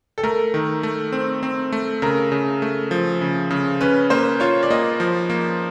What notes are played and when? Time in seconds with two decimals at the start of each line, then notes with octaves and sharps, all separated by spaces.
0.18 A4
0.23 A3 A#4
0.54 D#3
0.83 A3
1.12 C4
1.43 C4
1.72 A3
2.02 C#3 A#4
2.32 C#3
2.62 A3
2.91 F3
3.21 C#3
3.50 C#3
3.81 C#4 B4
4.10 A#3 C5
4.40 F4 C#5
4.63 D5
4.70 A#3 D#5
5.00 F3
5.30 A#3